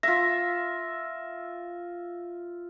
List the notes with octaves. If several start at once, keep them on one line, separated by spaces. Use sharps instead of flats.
F4 E5 A#6